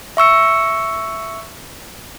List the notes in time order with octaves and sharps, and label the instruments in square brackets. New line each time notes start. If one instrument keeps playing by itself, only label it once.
[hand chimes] E5 C#6 E6 C#7